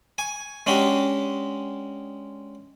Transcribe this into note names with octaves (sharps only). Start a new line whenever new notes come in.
G#5 C#6
G#3 C#4 D4 F#4 G4